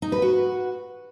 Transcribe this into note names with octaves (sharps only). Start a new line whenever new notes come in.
D#4
B4
F#4